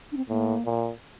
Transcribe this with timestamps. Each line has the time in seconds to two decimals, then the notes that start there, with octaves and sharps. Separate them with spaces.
0.12 D4
0.17 C4
0.29 A2 A#3
0.66 A#2